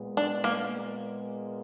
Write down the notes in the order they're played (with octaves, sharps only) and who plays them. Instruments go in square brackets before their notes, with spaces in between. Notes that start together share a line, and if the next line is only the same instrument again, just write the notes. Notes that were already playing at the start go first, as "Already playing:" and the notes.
Already playing: [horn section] A#2 G#3 B3
[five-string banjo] D4
A#3